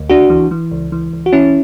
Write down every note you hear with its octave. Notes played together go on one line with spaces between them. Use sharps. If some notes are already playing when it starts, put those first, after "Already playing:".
Already playing: D2
C#2 D4 F#4
E3
E3
C#2
E3
C#2
F#4
E3 C#4 E4